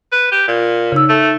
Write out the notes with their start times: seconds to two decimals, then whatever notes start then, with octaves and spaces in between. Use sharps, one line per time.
0.12 B4
0.32 G4
0.48 A#2
0.92 C#3 D#4 E6
1.09 A3